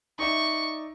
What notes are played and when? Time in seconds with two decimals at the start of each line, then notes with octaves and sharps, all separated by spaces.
0.19 D#4 D5 E5 C#6